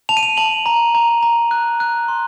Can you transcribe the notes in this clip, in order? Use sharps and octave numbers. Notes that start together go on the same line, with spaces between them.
A5 F7
D#7
F7
A5 F#7
A#5
A#5
A#5
F#6
F#6
C6